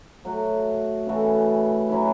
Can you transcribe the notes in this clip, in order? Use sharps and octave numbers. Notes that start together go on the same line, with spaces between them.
F#3 A3 F#4
C#3 E3 A3 F#4
F#3 C#4 E4